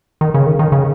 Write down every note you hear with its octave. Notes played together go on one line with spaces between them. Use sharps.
D#3
C#3
D#3
D#3
C#3